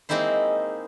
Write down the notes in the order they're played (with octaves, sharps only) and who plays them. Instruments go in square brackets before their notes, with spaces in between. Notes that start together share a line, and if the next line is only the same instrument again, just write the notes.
[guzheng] G#3 A#3 C4 D#4 E4 C5